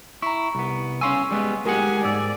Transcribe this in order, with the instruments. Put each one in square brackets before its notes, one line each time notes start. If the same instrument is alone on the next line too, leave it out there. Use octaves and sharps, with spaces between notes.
[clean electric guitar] E4 [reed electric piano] A#5 C#6
[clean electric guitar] C2 B3
[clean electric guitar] C#4 F5 G#5 [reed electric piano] C6 C#6 E6
[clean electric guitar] G3 G#3 B3
[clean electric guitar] G#3 G#4 F#5 [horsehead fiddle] G4 G#5 [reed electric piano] A#4
[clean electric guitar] G#2 [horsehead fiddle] D5 [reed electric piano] E6